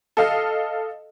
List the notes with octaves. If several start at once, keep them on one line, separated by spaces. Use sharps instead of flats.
A4 D#5 F5